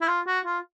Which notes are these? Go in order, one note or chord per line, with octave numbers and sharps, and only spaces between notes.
E4
F4
F#4
F4